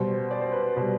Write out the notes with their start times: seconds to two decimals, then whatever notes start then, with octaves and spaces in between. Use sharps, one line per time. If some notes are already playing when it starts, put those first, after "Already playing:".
Already playing: B2 G3 C5
0.31 D5
0.41 C5
0.52 B4
0.62 C5
0.76 B2 G3